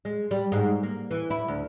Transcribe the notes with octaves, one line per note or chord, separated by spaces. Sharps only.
G#3
G3
G#2
A#3
E3
E4
D2